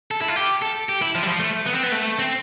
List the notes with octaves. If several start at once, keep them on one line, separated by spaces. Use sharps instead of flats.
A4
E4
F4
G4
A4
G4
E4
F3
G3
F3
A3
B3
C4
B3
A3
C4